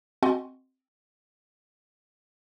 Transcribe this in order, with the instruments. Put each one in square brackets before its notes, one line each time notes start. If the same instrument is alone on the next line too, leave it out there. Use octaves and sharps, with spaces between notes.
[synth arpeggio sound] C4 F#4 D#5 F#5 G#5 C6